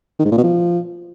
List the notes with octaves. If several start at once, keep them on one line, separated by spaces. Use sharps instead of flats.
D#3
G#2
A#2
B2
F3